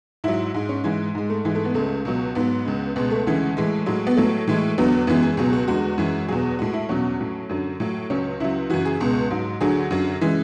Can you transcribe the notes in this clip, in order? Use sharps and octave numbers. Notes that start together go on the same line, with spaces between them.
G#2 F#3 E4
G#2 G#3
C#4
G#2 E3 G#3
G#2 G#3
A3
G#2 E3 G#3
A3
B3
C#2 C#3 G#3 A3
C#2 B2 F#3
G#2 F#3 B3
C#2 C#3 G#3
C#2 B2 G#3 B3
A3
D2 C#3 E3 G#3
A2 E3 G#3
A2 F#3 G#3
B3
A2 F#3 A3
A2 E3 G#3
E2 D3 F#3 B3
F#2 E3 G#3 B3
G#4
C#2 B2 F#3 G#4
F#4
E2 D3 G#3 F#4
F#2 E3 G#3
E2 B2 F#3 G#4
A2 G#3 F#4
E4
E2 B2 F#3 C#4
A2 F#3
F#2 D3 F#3
A2 F#3
C#2 C#3 F#3 C#4
C#2 C#3 F#3 E4
F#2 C#3 E3 F#4
G#4
C#2 B2 G#3
G#2 F#3
D2 D3 F#3 G#4
F#2 D3 F#3
C#3 E3 G#3